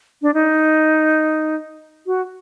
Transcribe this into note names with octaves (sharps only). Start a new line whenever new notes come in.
D4
D#4
F#4